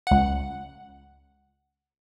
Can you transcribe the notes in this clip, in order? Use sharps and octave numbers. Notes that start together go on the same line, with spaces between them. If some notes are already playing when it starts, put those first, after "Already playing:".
C#2 F#5